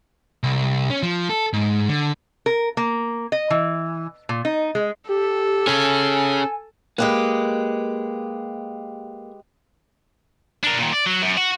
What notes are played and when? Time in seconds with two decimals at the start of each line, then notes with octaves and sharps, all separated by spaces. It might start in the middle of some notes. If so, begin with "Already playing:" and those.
0.43 C2
0.90 C#4
1.03 F3
1.30 A4
1.53 G#2
1.89 D3
2.46 A#4
2.77 A#3
3.32 D#5
3.50 E3
4.29 A#2
4.45 D#4
4.75 G#3
5.09 G4 A4
5.67 C#4 G#4 G#5
6.98 G#3 A#3 G4 B4
10.64 D4 A#4
10.78 A#2 D#3
10.93 D5
11.07 F#3
11.23 F#2
11.38 F#4